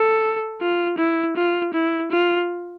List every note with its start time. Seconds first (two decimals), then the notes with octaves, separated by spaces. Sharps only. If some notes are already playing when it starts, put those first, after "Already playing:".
Already playing: A4
0.61 F4
0.98 E4
1.36 F4
1.74 E4
2.11 F4